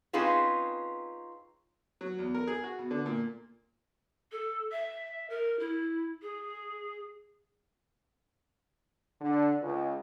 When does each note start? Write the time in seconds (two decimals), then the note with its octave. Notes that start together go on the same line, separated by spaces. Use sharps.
0.13 C4 C#4 D#4 F4 G#4 B4
2.01 F#3
2.19 E2
2.34 A#4
2.48 G#4
2.64 F#4
2.79 B2
2.91 D3
3.06 A#2
4.32 A4
4.72 E5
5.30 A#4
5.59 E4
6.22 G#4
9.21 D3
9.62 C#2